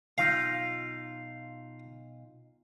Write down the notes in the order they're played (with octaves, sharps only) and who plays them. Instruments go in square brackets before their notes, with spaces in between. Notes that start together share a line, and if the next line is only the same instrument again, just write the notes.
[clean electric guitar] B1 D#4 F4 [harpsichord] F5